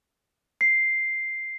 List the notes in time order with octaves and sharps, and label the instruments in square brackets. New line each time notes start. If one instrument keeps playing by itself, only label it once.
[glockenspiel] C7